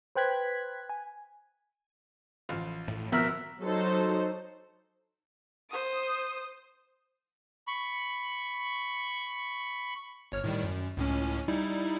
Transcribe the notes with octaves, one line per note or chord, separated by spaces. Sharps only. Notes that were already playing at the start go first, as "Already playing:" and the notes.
B4 C5 G5 F#6 G#6 B6
G#5
A1 F3 F5
A2
G#1 B2 F3 B3 A#4 E5 F6 F#6
F#3 D#4 A4 C5
C5 D#6
B5 C#6
G1 C#5 F6
A2 D#3 G3
F#2
C#2 A2 C#4
G3 D#4 E4